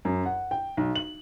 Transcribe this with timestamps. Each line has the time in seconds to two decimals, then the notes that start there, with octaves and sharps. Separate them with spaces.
0.05 F#2
0.26 F#5
0.51 G5
0.77 B1
0.95 F#7